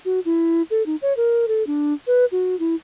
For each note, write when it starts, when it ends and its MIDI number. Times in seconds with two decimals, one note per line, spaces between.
0.05 0.20 66
0.25 0.62 64
0.70 0.85 69
0.86 0.96 63
1.02 1.13 73
1.17 1.46 70
1.48 1.65 69
1.67 1.93 62
2.07 2.25 71
2.32 2.58 66
2.59 2.75 64